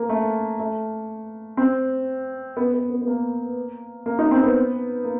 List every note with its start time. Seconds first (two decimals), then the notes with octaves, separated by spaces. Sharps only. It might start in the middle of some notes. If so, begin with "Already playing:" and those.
Already playing: A#3
0.09 A3
0.59 A3
1.57 C4
2.57 B3
2.74 B3
2.90 B3
3.01 B3
3.07 A#3
4.06 A#3
4.19 D#4
4.31 C4
4.43 B3
5.05 A#3